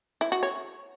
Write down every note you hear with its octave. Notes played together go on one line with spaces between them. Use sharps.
E4
F#4
C#5